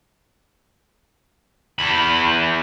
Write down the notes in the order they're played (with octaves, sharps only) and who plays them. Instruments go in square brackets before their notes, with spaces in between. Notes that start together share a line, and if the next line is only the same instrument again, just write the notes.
[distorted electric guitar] E2 B5